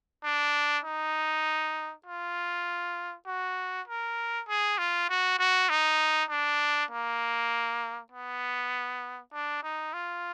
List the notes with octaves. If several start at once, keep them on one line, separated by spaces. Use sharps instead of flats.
D4
D#4
F4
F#4
A#4
G#4
F4
F#4
F#4
D#4
D4
A#3
B3
D4
D#4
F4